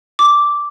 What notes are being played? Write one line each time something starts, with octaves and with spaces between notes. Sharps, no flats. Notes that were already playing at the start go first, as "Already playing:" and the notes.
D6